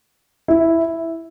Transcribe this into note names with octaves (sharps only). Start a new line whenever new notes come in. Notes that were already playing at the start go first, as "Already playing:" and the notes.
E4